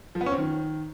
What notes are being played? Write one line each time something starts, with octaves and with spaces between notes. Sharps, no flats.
F3
B3
C#4
C4
D#3